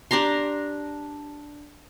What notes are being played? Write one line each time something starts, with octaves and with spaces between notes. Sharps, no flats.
D4 G4 A#5 C6